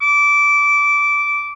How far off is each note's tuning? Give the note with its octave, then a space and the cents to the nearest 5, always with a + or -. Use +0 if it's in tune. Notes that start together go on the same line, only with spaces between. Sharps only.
D6 -15